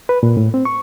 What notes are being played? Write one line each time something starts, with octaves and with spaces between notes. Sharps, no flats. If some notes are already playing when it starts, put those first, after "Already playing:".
B4
A#2
A2
C4
C#6